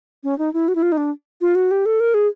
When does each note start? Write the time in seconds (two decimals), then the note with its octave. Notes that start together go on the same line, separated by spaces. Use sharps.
0.24 C#4
0.39 D#4
0.54 E4
0.68 F#4
0.75 E4
0.82 F4
0.92 D#4
0.97 D4
1.41 F4
1.55 F#4
1.71 G4
1.86 A4
2.00 A#4
2.14 G#4